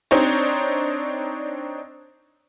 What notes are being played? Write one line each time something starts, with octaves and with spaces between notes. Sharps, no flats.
C4 D4 D#4 C5 C#5